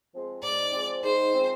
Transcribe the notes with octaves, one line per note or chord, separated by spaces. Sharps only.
F3 G#3 C4
G#2 D5
F3 G#3 C4
G#2 C5
F3 G#3 C4